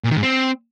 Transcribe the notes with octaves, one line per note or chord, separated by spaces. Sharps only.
A#2
D#3
G#2
C4